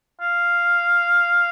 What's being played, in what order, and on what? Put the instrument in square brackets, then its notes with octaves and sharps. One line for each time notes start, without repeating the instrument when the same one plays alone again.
[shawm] F5